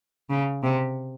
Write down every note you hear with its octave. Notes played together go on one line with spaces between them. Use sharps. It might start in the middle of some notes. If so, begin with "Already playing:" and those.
C#3
C3